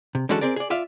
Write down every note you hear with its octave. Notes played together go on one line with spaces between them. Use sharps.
C3
D3 E3 G#3 C#4 F#4 A4
C4 G#4 A#4 D5
G#4 D5
F4 D5 E5 F5